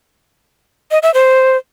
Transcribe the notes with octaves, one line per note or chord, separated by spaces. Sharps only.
D#5
E5
C5